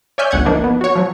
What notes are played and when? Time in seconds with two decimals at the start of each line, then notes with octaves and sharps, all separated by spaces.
0.18 C#5 D5 E5 G#5 F6 G6
0.31 G1 C#2 F#5 G#6
0.45 E3 F3 A#3 D4 D#4
0.64 B3
0.81 F#4 C#5
0.96 F3 F#3